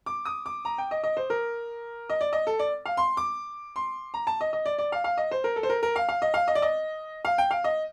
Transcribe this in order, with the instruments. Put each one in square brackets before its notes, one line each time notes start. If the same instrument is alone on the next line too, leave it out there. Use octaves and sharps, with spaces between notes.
[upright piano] D6
D#6
D6
A#5
G5
D#5
D#5
C5
A#4
D#5
D5
D#5
A4
D5
F5
C6
D6
C6
A#5
A5
D#5
D#5
D5
D5
F5
F5
D#5
C5
A#4
A4
C5
A#4
A#4
F5
F5
D#5
F5
D#5
D5
D#5
F5
G5
F5
D#5